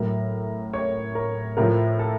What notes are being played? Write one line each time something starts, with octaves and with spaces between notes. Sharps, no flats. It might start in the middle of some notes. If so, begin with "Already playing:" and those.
Already playing: A2 F#3 A#4
C#5
A#4
A2 F3 A#4
A4